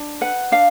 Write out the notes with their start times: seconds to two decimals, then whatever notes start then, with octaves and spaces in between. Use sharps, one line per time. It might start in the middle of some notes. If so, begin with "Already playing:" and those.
Already playing: D4
0.21 B4 F#5
0.52 D4 F5